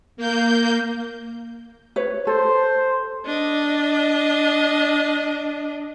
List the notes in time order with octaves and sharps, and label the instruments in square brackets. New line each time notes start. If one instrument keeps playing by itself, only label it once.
[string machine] A#3 G6
[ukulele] B4 C#5
[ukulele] A4 [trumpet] C5
[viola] D4 D#5